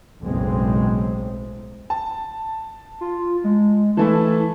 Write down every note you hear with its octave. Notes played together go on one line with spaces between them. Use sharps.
F#1 B1 A2 G#3 C4
A5
F4
G#3
E3 A3 E4 A5